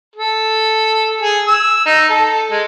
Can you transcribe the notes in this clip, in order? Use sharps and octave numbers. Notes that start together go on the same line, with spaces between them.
A4
G#4
E6
D#4
A4
G#3